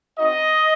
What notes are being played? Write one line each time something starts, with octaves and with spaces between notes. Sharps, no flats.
C4 D#4 F#4 D#5